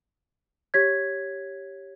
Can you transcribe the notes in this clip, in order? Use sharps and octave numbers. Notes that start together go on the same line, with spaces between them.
G4 C#5 G#6 B6